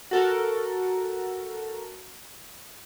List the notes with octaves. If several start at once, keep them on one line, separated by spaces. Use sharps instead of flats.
F#4 A4 A#4